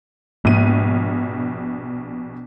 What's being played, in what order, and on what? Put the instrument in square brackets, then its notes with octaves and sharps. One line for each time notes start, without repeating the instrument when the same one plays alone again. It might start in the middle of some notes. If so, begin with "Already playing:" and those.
[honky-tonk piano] A#1 B2 D#7 [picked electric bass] G#2 A#3